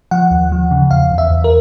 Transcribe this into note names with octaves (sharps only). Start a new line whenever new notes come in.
F3 F#5
D#2
F3
C#3
E2 F5
E2
E5
E2
A#4